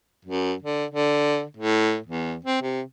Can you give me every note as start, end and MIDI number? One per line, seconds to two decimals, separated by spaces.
0.25 0.53 42
0.62 0.85 50
0.91 1.43 50
1.57 1.98 45
2.06 2.35 40
2.45 2.60 60
2.62 2.81 48